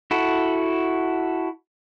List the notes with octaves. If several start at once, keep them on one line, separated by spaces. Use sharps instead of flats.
E4 F#4 A4